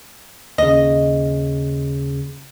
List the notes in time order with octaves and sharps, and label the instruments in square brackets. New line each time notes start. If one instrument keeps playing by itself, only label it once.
[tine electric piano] D#2 C#3 [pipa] D#5